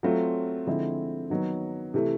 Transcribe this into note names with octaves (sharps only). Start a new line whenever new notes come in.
F#3 A3 C4 F4
D3 F3 G#3 C4 E4
D#3 F#3 B3
C3 E3 A3